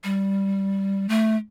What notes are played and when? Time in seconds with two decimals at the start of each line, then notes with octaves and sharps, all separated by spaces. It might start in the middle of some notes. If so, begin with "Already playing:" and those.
0.04 G3
1.09 A3